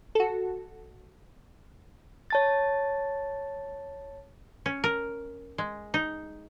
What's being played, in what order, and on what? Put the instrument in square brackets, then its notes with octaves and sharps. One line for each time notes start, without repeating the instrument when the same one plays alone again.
[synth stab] F#4 A4
[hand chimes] C#5 A5 A6
[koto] C#4
A#4
G#3
D#4